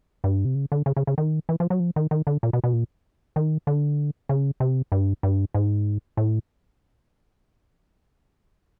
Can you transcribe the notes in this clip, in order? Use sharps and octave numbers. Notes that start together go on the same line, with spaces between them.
G2
C3
C#3
D3
C#3
C#3
C#3
D#3
E3
F3
F#3
F3
D#3
D#3
D3
A#2
B2
B2
A#2
D#3
D3
C#3
C3
G2
G2
G#2
A2